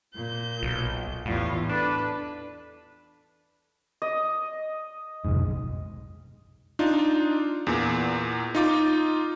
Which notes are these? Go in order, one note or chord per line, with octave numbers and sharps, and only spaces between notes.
A#2 G6
B1
E2 A2 G3 F4
D4 A4 B4
D#5
F1 B1 G#2
D4 D#4 F4
E2 A#2
D#4 F4 D6